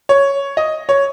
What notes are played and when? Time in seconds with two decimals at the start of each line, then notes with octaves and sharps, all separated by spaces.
0.09 C#5
0.57 D#5
0.89 C#5